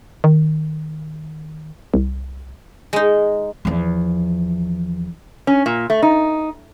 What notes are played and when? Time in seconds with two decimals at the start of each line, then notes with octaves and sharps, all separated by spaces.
0.24 D#3
1.94 C2
2.93 G#3 D#4
3.65 E2 F3
5.47 C#4
5.66 A#2
5.90 A3
6.02 D#4